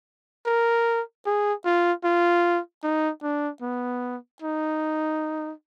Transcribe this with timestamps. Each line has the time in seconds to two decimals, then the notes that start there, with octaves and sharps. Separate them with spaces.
0.46 A#4
1.26 G#4
1.65 F4
2.04 F4
2.83 D#4
3.22 D4
3.62 B3
4.42 D#4